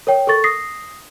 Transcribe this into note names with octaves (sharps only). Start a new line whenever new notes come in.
A#4 C#5 G5
A4 A#4 C#6 A6
D#6 A#6 C7